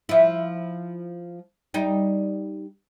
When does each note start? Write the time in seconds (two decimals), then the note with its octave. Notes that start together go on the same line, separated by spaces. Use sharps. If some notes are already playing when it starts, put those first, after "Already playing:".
0.09 F3 E4
1.74 G3 D#4